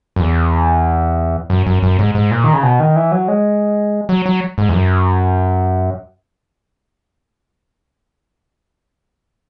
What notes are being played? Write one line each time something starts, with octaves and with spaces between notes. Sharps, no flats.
F#2
E2
F#2
F#2
F#2
G#2
G#2
A#2
D#3
C#3
B2
D#3
E3
F#3
G#3
F#3
F#3
G#2
E2
F#2